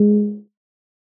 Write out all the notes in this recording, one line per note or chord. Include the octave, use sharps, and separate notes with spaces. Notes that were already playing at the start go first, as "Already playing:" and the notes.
Already playing: G#3